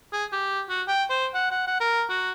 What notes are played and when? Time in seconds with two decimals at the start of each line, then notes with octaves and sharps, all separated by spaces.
0.13 G#4
0.32 G4
0.69 F#4
0.88 G5
1.10 C5
1.34 F#5
1.51 F#5
1.67 F#5
1.80 A#4
2.09 F#4